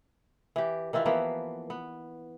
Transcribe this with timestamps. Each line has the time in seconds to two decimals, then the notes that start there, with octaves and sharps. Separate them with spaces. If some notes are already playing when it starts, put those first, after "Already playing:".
0.56 E3 G4
0.93 D#3 E3 E4 F4
1.06 E3 F3 A#3 B3
1.70 B3